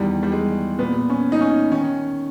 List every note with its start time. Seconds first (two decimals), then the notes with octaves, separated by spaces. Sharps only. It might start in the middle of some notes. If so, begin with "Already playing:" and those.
Already playing: E2 D#3 G3
0.23 G3
0.32 G#3
0.79 A#2 B3
1.10 C#4
1.32 D#4
1.41 C#4
1.72 D#3 C#4